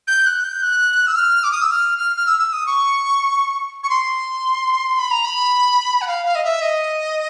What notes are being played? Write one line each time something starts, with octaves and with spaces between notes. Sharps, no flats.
G6
F#6
G6
F#6
E6
F6
D6
D#6
E6
F6
F6
F6
E6
E6
D#6
C#6
C#6
C6
B5
A#5
B5
F#5
F5
F5
D#5
E5
D#5